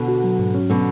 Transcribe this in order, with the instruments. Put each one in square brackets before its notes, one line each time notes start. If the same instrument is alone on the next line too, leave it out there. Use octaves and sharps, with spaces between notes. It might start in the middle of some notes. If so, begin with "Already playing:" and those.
Already playing: [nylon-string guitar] B2 D3
[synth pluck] F#4
F#3
G#2
C#4
[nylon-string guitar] B2 D3 [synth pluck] F#3